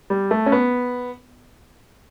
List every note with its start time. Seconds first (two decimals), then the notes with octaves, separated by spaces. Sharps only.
0.10 G3
0.31 A3
0.46 C#4
0.52 B3